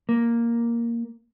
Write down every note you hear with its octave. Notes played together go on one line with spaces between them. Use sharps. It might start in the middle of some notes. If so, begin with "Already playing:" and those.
A#3